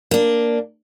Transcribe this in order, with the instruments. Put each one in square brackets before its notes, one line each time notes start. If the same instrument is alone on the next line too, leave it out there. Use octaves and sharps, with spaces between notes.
[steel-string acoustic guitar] A#3 D4